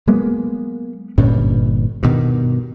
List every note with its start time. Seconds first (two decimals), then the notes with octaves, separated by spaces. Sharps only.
0.07 F#3 G#3 A#3 B3
1.18 G1 G2 A#2 C#4
2.03 G2 B2 D#3